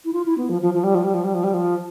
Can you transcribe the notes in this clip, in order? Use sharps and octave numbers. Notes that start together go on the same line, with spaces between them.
E4
F4
E4
B3
F3
F3
F3
G3
F3
G3
F3
G3
F3
G3
F3